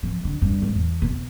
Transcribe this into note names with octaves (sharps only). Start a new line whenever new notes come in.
F3
D3
G2
G#2
E2
B2